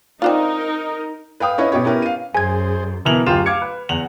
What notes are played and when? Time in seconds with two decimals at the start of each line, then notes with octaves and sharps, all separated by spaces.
0.22 C4 D4 D#4 F4 A#4
1.40 B4 F5 G5 D#6
1.58 C#4 E4 B4 C#5 D#5
1.72 B2 G4 B4 C#5
1.84 B3 C#4 E4 G4 A#4 B4
2.02 F5 D#7
2.35 F#2 G#4 C5 G#5 G#6
3.05 B2 E3 E4 A#4 F7 F#7
3.26 D1 F#2 F4 G4 C6 E7
3.46 F5 D6 G#6 C#7
3.62 B4
3.89 E2 F#5 F7 F#7